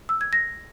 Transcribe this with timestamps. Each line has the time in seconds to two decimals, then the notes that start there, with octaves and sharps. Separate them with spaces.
0.09 E6
0.21 G#6
0.33 A#6